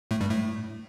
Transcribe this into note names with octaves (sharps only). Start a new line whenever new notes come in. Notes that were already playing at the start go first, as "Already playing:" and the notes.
A2 A3
G2 G3
A2 A3